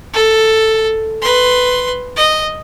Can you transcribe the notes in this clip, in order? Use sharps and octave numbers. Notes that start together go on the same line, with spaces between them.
A4
B4 C6
D#5